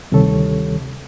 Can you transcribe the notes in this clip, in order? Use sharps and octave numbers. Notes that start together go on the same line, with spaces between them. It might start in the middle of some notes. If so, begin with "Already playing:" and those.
D2 C3 D#3 G3 A4 C#5